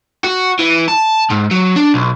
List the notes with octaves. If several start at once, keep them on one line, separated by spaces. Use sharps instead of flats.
F#4
E3
A5
G#2
F#3
D4
B1